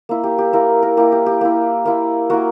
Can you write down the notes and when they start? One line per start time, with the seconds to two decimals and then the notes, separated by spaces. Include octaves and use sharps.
0.09 A#3 E4
0.24 G4
0.38 G4
0.53 A#3 E4 A#4
0.83 A#4
0.97 A#3 E4 G4
1.12 G4
1.26 G4
1.41 A#3 E4
1.85 A#3 E4
2.30 A#3 E4 F#4